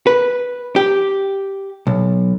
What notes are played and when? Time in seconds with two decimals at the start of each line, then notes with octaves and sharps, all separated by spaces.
0.07 B4
0.76 G4
1.87 B1